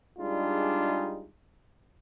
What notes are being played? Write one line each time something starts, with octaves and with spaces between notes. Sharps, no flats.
G3 G#3 D4 D#4 F4 G#4